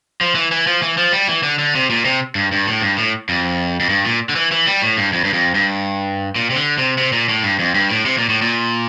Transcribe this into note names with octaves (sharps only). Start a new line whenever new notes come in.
F3
E3
E3
F3
E3
F3
G3
E3
D3
D3
C3
A#2
C3
G2
G2
A2
G2
A2
F2
F2
G2
A#2
D3
E3
E3
G3
A2
G2
F2
G2
F2
G2
A#2
C3
D3
C3
C3
A#2
A2
G2
F2
G2
A2
C3
A#2
A2
A#2